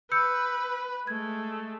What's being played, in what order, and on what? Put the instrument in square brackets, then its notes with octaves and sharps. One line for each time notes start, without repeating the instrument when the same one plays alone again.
[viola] B4 [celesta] E6 G6 C#7
[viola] G#3 A3 [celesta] G#6